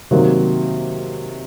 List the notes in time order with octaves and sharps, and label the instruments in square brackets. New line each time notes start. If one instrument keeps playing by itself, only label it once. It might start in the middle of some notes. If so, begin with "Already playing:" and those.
[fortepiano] C3 D#3 F#3 A#3